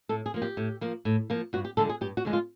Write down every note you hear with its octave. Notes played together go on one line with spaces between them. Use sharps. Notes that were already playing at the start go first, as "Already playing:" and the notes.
A2 A4
G#4
F3 A#3
G4
A2
F3 A#3
A2
F3 A#3
G2 F#4
G4
D3 F3 G#3 A4
G#4
G2 G4
F#4
D3 F3 G#3
F4